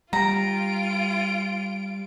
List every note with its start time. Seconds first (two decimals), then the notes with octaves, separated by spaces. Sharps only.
0.13 G3 F4 A#5 D7